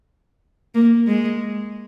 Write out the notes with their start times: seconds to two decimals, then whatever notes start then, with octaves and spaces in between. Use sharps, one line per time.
0.75 A#3
1.07 G#3